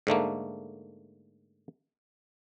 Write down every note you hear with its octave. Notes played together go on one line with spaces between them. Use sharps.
G#2 D3 A3 A#3